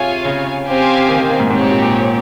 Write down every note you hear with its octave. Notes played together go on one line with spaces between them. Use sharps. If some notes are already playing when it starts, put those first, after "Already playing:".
Already playing: C3 F4 G#4 C#5 F5 G#5
C#3
C4 G4 C5 F5 G#5
D#3
D#3
D#3
G#2
G#2 C4 G4 C#5
G#2
A#2
A#2